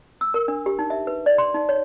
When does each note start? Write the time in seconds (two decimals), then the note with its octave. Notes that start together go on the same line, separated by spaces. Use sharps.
0.21 E6
0.34 A#4
0.48 D4
0.66 G4
0.79 D#4
0.90 E5
1.07 B4
1.26 D5
1.38 C6
1.54 D#4
1.69 C#5